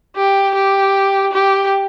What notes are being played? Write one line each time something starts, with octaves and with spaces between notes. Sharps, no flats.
G4
G4
G4